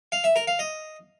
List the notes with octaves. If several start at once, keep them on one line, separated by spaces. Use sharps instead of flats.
F5
E5
A#4
F5
D#5